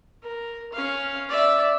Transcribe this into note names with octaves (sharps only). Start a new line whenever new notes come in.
A#4
C#4 F5
D5 E5